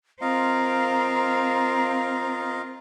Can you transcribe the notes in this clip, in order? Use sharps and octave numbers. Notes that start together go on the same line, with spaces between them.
C4 F4 A#4 D#5 F5 A#5